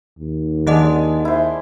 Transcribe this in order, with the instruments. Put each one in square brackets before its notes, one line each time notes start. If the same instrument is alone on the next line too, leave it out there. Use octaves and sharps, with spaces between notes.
[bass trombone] D#2
[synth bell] D#3 D#5 F#5 [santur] G#3 D4 D5
[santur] E4 C5